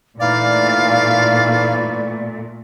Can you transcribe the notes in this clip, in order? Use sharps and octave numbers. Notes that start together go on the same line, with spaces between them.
A#2 E3 A3 D#4 D5 F5